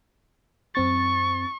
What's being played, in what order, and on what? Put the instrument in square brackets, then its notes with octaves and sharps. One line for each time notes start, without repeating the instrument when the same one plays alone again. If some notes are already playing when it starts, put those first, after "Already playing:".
[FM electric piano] F#2 C4 A6 [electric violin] C#6